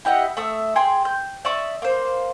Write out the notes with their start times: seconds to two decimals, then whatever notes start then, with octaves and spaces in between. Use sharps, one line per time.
0.05 E4 G4 D#5 F#5
0.37 A3 E5 D#6
0.76 G#4 G5 C6
1.05 G6
1.45 D5 E5 C#6 D#6
1.82 A#3 C5